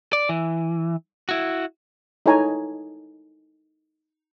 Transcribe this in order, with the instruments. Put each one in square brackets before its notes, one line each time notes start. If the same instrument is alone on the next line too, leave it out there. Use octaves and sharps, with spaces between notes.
[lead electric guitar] D5
E3
E4 F#4
[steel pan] D#4 E4 A4 C#5 G#5 A#5